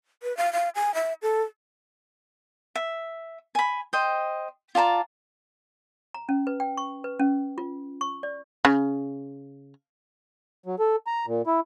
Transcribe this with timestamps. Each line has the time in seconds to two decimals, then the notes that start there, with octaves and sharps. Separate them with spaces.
0.23 B4
0.37 F5
0.53 F5
0.75 G#5
0.94 E5
1.22 A4
2.75 E5
3.55 G#5 B5
3.93 C5 D#5 G5
4.75 F4 D5 A5 A#5
6.14 A#5
6.29 C#4
6.47 B4
6.60 G5
6.77 C#6
7.04 B4
7.20 C#4
7.58 F4
8.01 C#6
8.23 D5
8.65 C#3
10.66 F#3
10.79 A4
11.07 A#5
11.27 A#2
11.47 E4